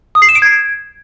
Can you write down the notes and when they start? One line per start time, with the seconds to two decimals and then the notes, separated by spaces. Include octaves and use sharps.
0.15 D#6
0.22 C7
0.29 E7
0.35 D7
0.42 G#6